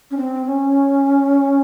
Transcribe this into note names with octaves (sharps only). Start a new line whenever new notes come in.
C#4
C4
C#4